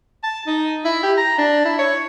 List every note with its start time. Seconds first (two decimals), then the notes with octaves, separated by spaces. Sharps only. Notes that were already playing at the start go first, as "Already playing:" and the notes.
0.23 A5
0.47 D#4
0.85 E4
1.03 G4
1.18 A#5
1.38 D4
1.65 E4
1.78 C#5